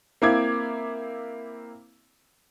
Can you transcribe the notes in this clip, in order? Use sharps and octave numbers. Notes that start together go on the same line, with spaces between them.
A#3 C4 E4 F5 D6 G#6